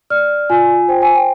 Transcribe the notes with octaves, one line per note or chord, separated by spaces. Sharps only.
D5 F6
F4 G#5
C5 G5
G#5
G5